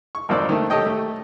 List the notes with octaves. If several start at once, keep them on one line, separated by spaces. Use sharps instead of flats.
C#6
G#1 F2 A#3 C5 D5 E6
D#3 A3
G4 A4 C#5 D#5 G5
A3